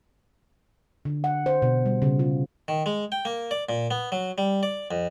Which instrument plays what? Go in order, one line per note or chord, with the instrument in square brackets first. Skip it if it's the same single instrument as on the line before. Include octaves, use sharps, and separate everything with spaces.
[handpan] D3
F#5
C5
B2
G3
C#3
F4
[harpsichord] D#3
G#3
G5
A#3
D5
A#2
B3
F#3
G3
D5
F2